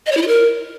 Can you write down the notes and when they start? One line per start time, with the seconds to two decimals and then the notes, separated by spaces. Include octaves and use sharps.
0.06 D#5
0.12 C#5
0.17 E4
0.22 F4
0.27 A#4